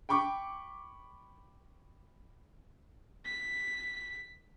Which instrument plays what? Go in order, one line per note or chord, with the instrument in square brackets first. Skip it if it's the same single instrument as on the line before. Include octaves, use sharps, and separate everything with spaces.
[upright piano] G5 B5 C#6 D6
[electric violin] B6